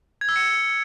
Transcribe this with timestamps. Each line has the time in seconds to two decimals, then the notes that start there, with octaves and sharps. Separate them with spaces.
0.21 G#6
0.29 E6
0.36 C#7